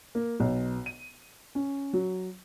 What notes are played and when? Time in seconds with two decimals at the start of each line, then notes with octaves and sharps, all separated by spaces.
0.15 A#3
0.40 B1
0.86 D#7
1.55 C#4
1.93 F#3